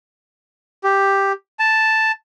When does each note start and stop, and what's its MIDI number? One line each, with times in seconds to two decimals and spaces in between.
0.84 1.32 67
1.59 2.12 81